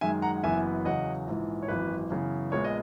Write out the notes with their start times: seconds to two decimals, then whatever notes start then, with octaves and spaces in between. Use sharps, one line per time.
0.01 F#2 D#3 G#3 E5 G#5
0.22 F#5 A#5
0.37 F#5
0.43 F#1 F#2 E3 B3 E5 G#5
0.85 E2 C#3 F#3 D#5 F#5
1.27 A#1 G#2 E3
1.63 C#5
1.68 G#1 F#2 E3 B4
2.10 F#2 C#3 E3 B3
2.52 A#1 A#2 G#3 B3 C#5
2.64 D#5